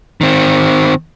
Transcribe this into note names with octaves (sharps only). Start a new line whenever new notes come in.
D#3 C4